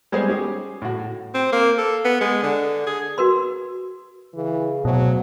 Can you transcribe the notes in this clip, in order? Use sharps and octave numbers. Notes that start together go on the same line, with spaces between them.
G3 G#3 B3 G#4 C5
C#4 G4 G#4
A2 F#4
C4
A#3
A4
B3
G#3
D3
G#4
F#4 A#4 B4 C6
C#3 E3
D2 B2 F#3